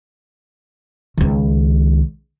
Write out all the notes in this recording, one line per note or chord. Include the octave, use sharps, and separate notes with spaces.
C#2 D#3